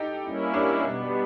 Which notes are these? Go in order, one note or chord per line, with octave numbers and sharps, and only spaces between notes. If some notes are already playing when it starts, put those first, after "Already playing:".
Already playing: D#4 G4 A4
G3 A#3 C#4 E4
D4
B2 G3 B3